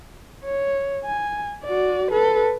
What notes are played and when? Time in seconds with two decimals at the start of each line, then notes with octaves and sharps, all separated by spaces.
0.44 C#5
1.05 G#5
1.64 F#4 D5
2.11 A4 B4